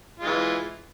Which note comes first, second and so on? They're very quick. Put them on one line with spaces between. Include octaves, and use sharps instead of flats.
F4 G#3 E3